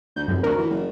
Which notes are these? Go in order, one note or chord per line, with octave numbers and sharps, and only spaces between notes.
D2 G6
F1 F#2
D2 F#4 A#4
E3
F#1